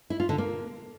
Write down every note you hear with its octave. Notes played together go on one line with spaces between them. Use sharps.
E4
F4
D3
A#3